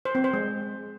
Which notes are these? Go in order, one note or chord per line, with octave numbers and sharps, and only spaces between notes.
C5
C4
C5
G#3